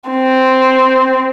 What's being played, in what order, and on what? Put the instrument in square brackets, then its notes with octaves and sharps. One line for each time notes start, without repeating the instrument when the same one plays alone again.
[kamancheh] C4